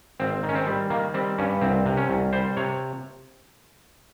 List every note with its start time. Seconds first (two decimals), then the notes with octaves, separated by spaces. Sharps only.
0.20 G#1 C4
0.43 D#3
0.49 C#4
0.55 C4
0.67 G3
0.90 D#3 A#3
1.14 G3 C4
1.39 G2 C#4
1.61 C2 C4
1.86 C3
1.97 C#4
2.10 C2
2.33 G3 C5
2.57 C3 C#5